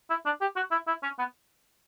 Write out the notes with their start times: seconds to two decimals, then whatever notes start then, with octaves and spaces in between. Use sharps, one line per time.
0.10 E4
0.25 D4
0.41 G4
0.56 F#4
0.71 E4
0.87 E4
1.03 C#4
1.19 B3